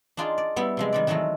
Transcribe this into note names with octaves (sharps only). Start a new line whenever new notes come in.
D4 D#4 F4 G#4 D5
D5
G3 B3 E4
C3 F3 G#3
D#3 G3 D5
D#3 E3 F#3 G#3 A3